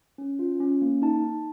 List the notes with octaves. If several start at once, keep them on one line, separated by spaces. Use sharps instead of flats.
C#4
F4
C#4
A#3
D#4 A5
D#4